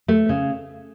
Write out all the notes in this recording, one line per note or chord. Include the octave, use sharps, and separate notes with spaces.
A3
C#3